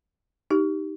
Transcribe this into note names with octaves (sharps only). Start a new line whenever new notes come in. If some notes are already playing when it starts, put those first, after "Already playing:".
D#4 G4